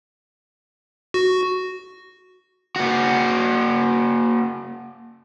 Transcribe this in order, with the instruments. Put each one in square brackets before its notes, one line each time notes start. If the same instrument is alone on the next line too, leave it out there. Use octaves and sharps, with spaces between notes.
[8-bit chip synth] F#4
[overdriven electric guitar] A#3 F#4